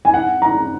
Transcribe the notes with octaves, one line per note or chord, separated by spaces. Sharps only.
G#5
F#5
A#5